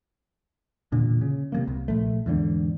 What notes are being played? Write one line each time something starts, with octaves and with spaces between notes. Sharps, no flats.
E1 A#2 D3
C#3
C3 G#3 A#3
C2
A#1 A3
E2 G#2 D3